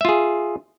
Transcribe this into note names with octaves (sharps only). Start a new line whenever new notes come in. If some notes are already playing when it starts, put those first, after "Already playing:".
F4 G#4 E5